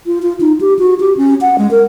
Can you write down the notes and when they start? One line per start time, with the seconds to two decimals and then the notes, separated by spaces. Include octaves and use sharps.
0.06 F4
0.22 F4
0.40 D#4
0.61 G4
0.79 F#4
1.00 G4
1.17 C#4
1.41 F#5
1.58 G#3
1.71 A#4